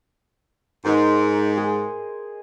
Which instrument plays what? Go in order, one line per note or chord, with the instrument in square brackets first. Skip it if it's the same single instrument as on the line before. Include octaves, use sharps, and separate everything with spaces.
[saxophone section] G#2 [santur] A#4 C5 D#5
[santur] G#4